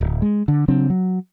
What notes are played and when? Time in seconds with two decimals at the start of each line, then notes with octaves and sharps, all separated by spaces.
0.01 D1
0.22 G#3
0.48 D3
0.68 C#3 F#3 C4 D4
0.90 F#3